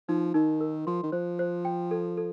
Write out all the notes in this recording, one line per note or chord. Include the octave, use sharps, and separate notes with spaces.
F3 D#4
D#3 D#4
A#4
F3 C6
D#3
F3 C5
C5
G5
A4
A4